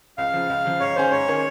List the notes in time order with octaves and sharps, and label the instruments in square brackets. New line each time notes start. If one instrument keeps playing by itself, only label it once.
[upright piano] C#2 [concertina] F5
[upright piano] C#3 F3
C#2
C#3 F3
[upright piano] G#2 [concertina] C#5
[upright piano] D#3 A#3 C#4 G#4 [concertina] C5
[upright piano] G#2 [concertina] C#5
[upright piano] D#3 A#3 C#4 G#4